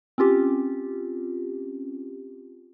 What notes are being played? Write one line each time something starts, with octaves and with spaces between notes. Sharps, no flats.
C4 C#4 F4 G4